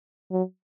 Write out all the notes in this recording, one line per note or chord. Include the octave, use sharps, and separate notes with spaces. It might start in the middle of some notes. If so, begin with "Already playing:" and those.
F#3